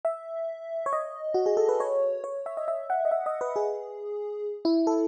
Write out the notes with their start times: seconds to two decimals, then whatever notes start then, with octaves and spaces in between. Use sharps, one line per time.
0.05 E5
0.86 C#5
0.93 D#5
1.34 F#4
1.46 G#4
1.57 A4
1.69 B4
1.80 C#5
2.24 C#5
2.46 E5
2.57 D#5
2.68 E5
2.90 F#5
3.05 D#5
3.11 E5
3.26 D#5
3.41 B4
3.56 G#4
4.65 E4
4.87 A4